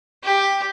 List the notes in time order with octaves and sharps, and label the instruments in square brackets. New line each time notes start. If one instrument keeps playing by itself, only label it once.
[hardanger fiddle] G4